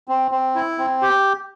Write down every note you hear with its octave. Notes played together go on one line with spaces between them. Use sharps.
C4
C4
E4
C4
G4